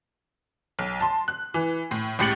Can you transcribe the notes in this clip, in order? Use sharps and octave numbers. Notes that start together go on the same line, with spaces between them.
B1
A5 C6
F#6
E3
A2
C#2 A2 G4 A6 C#7 F#7